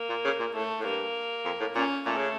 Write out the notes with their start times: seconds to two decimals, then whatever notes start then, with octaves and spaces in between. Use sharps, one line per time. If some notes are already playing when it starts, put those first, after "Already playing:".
Already playing: A#3
0.09 A#2
0.25 C#3
0.40 A#2
0.54 A2 A3
0.79 A2
0.85 G2 A#3
1.45 F2
1.60 A2
1.75 A#2 C#4
2.06 A#2 A3
2.17 C#3